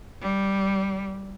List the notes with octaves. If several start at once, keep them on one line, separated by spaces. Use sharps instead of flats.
G3